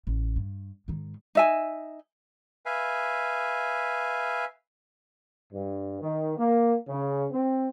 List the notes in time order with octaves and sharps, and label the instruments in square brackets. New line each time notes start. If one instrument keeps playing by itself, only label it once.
[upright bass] A1
G2
G#2 D#3
[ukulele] D#4 E5 G#5
[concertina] B4 E5 F5 G#5
[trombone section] G2
D#3
A#3
C#3
C4